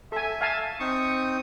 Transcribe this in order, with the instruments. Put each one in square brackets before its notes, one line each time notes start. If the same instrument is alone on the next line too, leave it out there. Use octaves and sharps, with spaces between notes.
[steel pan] A4 G#5 [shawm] E5
[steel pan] F5 G#5 A5
[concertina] C4 D#4 D#6 [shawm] C#6